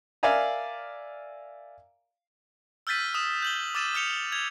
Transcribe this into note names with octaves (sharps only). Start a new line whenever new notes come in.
A#4 D5 E5 F5 G#5 A#5
E6 F6 G6 A6 B6 D#7
D#6 E7
G6 F#7 G7
D6 E6 A6 D#7 E7
F6 G6 C#7 F7 G7
G#6 F7